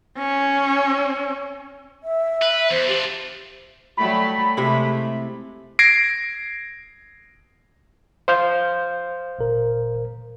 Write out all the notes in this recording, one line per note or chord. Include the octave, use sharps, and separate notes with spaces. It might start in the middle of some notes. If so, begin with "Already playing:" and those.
C#4
E5
B4
E2 C5
D4 F4 G4
F#3 G3 A3 B5
C3 G#3 A3 E4
G#6 A#6 C7 D7
C5 F5 G6
G1 A#2 A#4